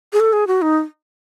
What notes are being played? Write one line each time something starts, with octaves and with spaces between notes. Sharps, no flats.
G#4
A4
G#4
F#4
D#4